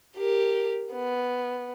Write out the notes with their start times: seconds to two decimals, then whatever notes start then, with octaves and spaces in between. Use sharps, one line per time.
0.17 G4 A#4
0.93 B3